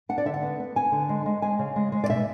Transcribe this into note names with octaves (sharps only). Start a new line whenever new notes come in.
D4 F#5
D5
D3 E5
F#5
B3
B3
B3 G#5
D3
G#3
G#3
G#3 G#5
C#3
G#3
G#3
D5
B2 E5